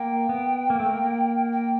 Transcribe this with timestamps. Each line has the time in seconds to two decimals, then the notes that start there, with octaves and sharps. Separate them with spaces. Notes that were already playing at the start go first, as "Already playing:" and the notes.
Already playing: A#3 G5
0.29 B3
0.70 A#3
0.80 A3
0.90 A#3
1.52 G5